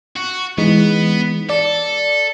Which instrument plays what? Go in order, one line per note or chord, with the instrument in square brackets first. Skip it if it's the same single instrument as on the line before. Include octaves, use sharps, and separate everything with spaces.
[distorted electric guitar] F#4
[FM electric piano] E3 G#3 D#4 [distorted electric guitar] B3
[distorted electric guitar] A4 [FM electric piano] D5